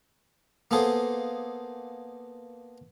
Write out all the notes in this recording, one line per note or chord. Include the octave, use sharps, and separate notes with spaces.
A#3 B3 G#4 A4 C5